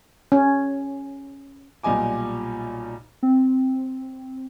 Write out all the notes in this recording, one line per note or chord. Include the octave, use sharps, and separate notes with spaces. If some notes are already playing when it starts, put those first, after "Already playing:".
C#4
B1 A#2 G3 D#5 G#5 D6
C4